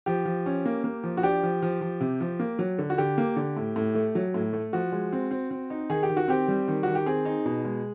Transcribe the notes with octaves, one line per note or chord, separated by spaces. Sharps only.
F3 G4
F3
C#4
A#3
A#3
F3
F#4
D4 G4
F3
F3
F3
C3
F3
A#3
F#3
D3
F#4
D3 G4
A#3
D3
A2
A2
A3
F#3
A2
A3
F3 F#4
G#3
C4
C4
C4
D#4
D#3 G#4
G4
D#3
F#4
C4 G4
G3
D#3
D#3 F#4
G4
C4 G#4
D#4
B2
G#3